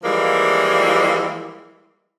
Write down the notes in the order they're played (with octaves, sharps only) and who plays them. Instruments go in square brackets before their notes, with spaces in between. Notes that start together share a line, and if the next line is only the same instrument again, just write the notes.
[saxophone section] E3 F3 G3 G#3 A#3